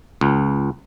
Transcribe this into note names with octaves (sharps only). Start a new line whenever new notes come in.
C#2